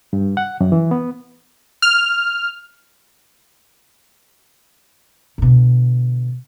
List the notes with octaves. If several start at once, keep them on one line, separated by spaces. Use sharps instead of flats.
G2
F#5
F#2
E3
B3
F6
B2 D3